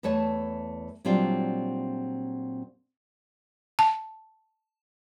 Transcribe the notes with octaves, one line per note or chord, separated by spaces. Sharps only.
E2 E3 A3 B4 C#5 A5
A#2 F#3 G3 C4 D4 F4
A5